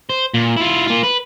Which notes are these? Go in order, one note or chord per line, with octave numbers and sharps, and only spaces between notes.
C5
A#2
E4 F4
A#3 F4
B4